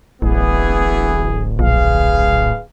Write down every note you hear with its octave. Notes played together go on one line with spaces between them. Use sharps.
D1 A1 E3 B3 G#4
A#1 G#4 B4 F5